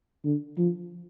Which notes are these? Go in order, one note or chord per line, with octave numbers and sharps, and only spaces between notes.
D3
F3